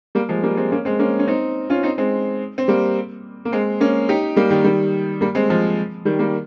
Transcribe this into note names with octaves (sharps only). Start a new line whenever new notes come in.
G3 A#3
F3 G#3
G3 A#3
G#3 C4
A#3 C#4
G#3 C4
A#3 C#4
C#4
C4 D#4
C#4 F4
C4 D#4
G#3 C4
C4
G3 A#3
A#3
G#3 C4
A#3 C#4
D#4 G4
G3 A#3
D#3 G3
D#3 G3
G3 A#3
G#3 C4
F3 G#3
D#3 G3
G3 A#3